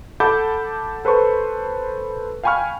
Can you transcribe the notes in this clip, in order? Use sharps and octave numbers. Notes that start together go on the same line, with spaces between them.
A4 F#5 A5 B5 D6 G6
A4 B4 C5 B5 C#6
F5 G5 G#5 B5 C#6 F6